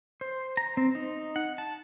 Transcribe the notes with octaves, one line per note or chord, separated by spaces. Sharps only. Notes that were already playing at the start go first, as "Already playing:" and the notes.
C5
A#5
C4
D#4
F#5
A5